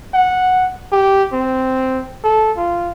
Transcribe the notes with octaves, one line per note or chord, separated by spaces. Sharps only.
F#5
G4
C4
A4
F4